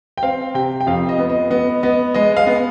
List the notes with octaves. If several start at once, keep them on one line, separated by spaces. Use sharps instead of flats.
G5
C4 F5
C3 G5
G5
F2 F5
D#5
B3
D#5
B3 D#5
B3 D#5
G#3 D#5
F5
B3